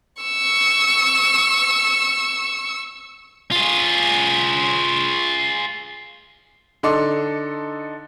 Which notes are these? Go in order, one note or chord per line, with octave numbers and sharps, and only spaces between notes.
C#6 E6
F4 G#4
D3 D#4 A4 C6 D6